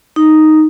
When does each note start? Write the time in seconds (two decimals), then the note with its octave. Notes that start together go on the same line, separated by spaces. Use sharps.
0.16 D#4